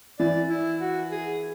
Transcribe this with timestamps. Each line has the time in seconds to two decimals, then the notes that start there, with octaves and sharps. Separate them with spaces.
0.19 E3 D5
0.50 E4
0.81 F#4
1.11 G#4